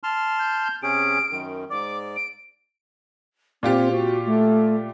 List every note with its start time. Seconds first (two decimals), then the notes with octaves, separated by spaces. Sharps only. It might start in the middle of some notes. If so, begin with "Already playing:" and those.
0.03 A5 C6 F6
0.39 G6
0.83 C3 C#4 G#4 D7
1.31 F#2 D#3
1.70 G#2 D5 D6
2.16 D7
3.63 A#2 C4 F4 G4
3.91 F#4
4.26 A3